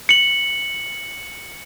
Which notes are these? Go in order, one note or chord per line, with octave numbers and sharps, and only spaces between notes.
C#7 F#7